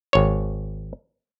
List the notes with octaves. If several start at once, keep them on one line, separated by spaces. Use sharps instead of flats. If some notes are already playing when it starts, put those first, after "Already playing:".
G#1 C#5